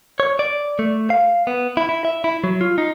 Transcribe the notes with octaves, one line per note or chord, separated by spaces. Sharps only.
C#5
D5
A3
F5
B3
E4
E4
E5
E4
F#3
F4
D#4